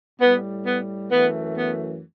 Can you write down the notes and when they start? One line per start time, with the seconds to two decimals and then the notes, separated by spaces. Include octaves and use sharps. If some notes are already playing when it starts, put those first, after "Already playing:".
0.20 A2 G3 B3
0.65 B3
1.11 F#2 E3 A3 B3
1.57 B3